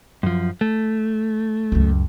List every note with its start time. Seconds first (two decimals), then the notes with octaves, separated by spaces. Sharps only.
0.23 F#2 F3
0.61 A3
1.72 C#2 F#2